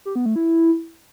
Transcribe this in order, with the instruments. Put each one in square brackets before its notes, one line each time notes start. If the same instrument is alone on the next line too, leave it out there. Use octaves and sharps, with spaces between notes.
[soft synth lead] G4
B3
A3
E4